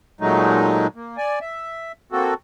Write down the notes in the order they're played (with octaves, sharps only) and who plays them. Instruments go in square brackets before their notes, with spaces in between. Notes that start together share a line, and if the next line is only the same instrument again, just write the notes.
[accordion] A#2 F#3 G#3 A3 D#4
A#3
D5 G#5
E5
A#3 C4 F#4 A4